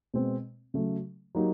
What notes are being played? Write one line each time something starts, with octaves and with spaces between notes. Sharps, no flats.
B2 G#3 C4
C#3 F#3 A3
F#3 A#3 D#4 G4